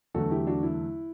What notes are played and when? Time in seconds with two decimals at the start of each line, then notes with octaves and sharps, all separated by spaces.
0.14 E2 D3 F#3 A3 F#4 A4
0.31 E4 G4
0.47 D4 F#4
0.63 E4